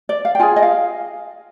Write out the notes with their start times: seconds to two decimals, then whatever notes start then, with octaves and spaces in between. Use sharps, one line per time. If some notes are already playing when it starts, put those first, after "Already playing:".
0.09 D5
0.25 F5
0.35 G5
0.39 F4 G#4 G#5
0.56 D#5
0.62 F5